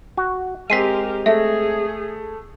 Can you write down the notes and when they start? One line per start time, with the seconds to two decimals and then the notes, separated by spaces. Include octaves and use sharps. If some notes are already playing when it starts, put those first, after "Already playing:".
0.17 F#4
0.70 G#3 C4 G4 A#4 B6 C7 D#7
1.26 A3 G#4 E5